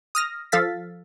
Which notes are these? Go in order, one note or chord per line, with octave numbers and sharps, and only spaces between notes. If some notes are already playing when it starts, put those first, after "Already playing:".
D#6 F6 A#6
F3 A4 F5 A6 B6